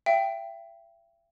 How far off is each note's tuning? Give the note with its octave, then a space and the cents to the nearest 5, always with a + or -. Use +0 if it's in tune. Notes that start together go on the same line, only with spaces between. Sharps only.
E5 +35 G5 +0